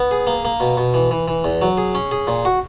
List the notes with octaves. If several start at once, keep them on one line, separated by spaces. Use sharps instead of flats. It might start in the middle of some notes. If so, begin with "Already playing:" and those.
Already playing: B3
G#4
A#3
A#3
B2
B2
E3
E3
E3
E2
F#3
G#4
C#4
G#4
A#2
F#4